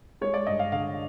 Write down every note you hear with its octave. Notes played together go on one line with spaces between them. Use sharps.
G#3 C#5
D5
G2 D#5
F5
D3 F5